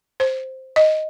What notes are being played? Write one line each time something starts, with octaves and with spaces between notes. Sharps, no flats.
C5
D#5